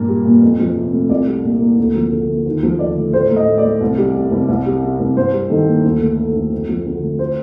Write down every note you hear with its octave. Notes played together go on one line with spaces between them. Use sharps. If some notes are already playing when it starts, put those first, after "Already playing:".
Already playing: G2 A#2 A#3
G3
A#2
F2
F3
C3
A3
C2 D5
G3
A#2
A#3
D2
F3
D3
A#3
D#2
F3
D3 D5
A3
A2 C5
A2
D#5
A3
D5
A3
C2
G3
C3
C2
C2
G3
C3
C2
G2 C5
G3
D#3 A4
A#3
D2
A3
D3
D2
F2
F3
D3
A3
C5